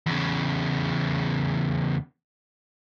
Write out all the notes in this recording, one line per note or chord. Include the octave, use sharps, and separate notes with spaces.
E2 C#3